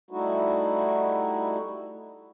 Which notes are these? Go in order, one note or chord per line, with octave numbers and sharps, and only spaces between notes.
G3 A3 D#4 E4 F#4